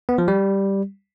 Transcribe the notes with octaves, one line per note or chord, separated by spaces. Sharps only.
B3
F3
G3